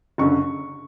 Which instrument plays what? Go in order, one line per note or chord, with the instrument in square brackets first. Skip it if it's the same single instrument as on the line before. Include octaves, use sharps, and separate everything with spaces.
[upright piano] F#1 F#2 D3 C#6